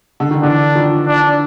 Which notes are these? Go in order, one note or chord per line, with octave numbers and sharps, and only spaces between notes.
D3
D#3
D3 E3 D4
D#3 F3
D4